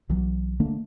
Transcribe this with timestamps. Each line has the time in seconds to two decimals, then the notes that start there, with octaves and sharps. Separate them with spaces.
0.09 B1 E3 F#3
0.60 D3 A3 A#3 D4